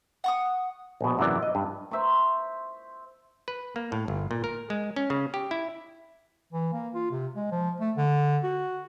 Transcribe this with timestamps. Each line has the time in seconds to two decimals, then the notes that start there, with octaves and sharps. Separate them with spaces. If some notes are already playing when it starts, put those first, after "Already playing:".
0.24 F#5 C#6 D#6
1.01 A#1 B2
1.18 G#1 F#2 C3 E3 D5
1.43 D#5
1.55 G2
1.91 C5 E5 A#5 C#6
3.48 B4
3.76 A#3
3.92 A2
4.08 G1
4.31 A#2
4.44 A#4
4.70 G#3
4.96 C#4
5.10 C#3
5.34 G4
5.51 E4
6.53 E3
6.73 A#3
6.94 F4
7.11 C3
7.35 G#3
7.51 F3
7.80 A3
7.97 D3
8.44 F#4